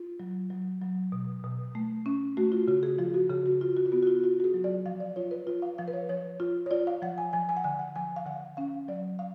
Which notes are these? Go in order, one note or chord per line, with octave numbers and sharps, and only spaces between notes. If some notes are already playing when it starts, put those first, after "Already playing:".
Already playing: F4
F#3
F#3
F#3
B2
B2
A3
C#4
A3 F#4
F4
C#3 F#4
G#4
F3 F4
F#4
C#3 G#4
F#4
F4
F#4
F4
B3 F#4
F#4
F4
F4 F#4
F#4
G#4
F#3
D5
F3 F5
D5
F4 C#5
B4
F4
F5
F3 F5
B4
C#5
F3 C#5
F4
C#5
F4 D5
F5
F3 F#5
G#5
F3 G#5
G#5
F#5
D3 G#5
F#5
F3 G#5
F5
D3 F#5
C#4 F5
F#3 D5
F5